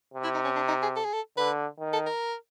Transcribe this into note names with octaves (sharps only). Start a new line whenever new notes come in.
C3
E4
D#4
C#4
D4
D#4
G#4
A4
G#4
A4
D3 B4
D#3
A4
A#4